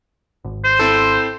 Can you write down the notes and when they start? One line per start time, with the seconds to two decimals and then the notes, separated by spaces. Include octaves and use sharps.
0.44 G#1
0.64 C5
0.79 C4 E4 A4